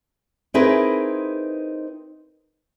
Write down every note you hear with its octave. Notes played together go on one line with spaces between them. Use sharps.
C4 D#4 E4 G#4 A#4 B4